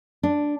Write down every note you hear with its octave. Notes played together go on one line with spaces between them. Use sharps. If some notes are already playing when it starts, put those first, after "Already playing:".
D4